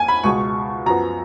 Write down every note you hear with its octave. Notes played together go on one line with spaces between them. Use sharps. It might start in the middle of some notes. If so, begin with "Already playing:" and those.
Already playing: F2 A#3 G#5
B5
C#2 B2 G#3 C#6
F#2 F3 B3 A#5